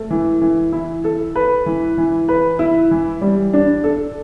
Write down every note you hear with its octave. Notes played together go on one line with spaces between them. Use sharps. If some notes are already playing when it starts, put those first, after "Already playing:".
Already playing: A3
E3
E3
E4
A4
B4
E3
E3
B4
E4
E3
G3
D4
A4